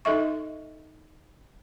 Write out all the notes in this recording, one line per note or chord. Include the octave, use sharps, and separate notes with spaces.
D#4 A4 D#5 E5 C#6